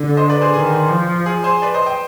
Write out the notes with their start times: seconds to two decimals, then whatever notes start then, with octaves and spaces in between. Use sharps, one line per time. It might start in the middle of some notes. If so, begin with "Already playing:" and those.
Already playing: D3
0.17 C5 D#5
0.29 B4 D5
0.41 G#4 C5
0.53 D#3 G#4
0.89 F3
1.26 G#4
1.44 G#4 C5
1.62 B4 D5
1.74 C5 D#5
1.86 D#5 G5